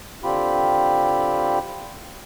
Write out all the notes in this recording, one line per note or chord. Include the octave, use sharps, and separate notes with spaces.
D3 C4 F4 G4 B5